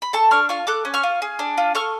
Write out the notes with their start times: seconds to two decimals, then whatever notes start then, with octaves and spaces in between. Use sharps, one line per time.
0.02 B5
0.13 A4 A5 C#6
0.31 D4 C#6 F6
0.49 F4 C#6 F6
0.67 A4 D6 F#6
0.85 C#4
0.94 C#6 F6
1.03 F4
1.22 G#4
1.39 D4
1.58 F4
1.75 A4 C#6 F6